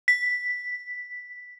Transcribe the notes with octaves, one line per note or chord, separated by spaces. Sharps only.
B6